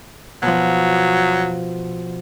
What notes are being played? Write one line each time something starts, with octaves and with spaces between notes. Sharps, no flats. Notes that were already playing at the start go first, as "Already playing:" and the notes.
B2 F3 F#3